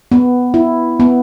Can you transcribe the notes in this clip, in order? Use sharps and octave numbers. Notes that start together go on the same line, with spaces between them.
B3
E4
B3